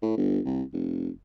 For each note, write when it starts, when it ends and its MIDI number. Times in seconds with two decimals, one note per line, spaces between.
0.02 0.16 45
0.17 0.39 31
0.46 0.63 36
0.73 1.09 29